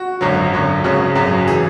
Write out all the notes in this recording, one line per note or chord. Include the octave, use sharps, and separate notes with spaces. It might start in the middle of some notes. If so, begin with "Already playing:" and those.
Already playing: F#4
G#1 F#2 D3 F#3
G#1 F#2 D3 F#3
G#1 F#2 C#3 F#3
G#1 F#2 C#3 F#3 G#4
E3 G#4